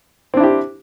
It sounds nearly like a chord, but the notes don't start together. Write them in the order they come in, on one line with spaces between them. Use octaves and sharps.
C4 D4 E4 G4